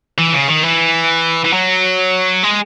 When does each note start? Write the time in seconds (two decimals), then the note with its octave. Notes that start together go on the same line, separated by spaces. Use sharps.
0.18 E3
0.33 C#3
0.48 D#3
0.63 E3
1.44 E3
1.53 F#3
2.43 G#3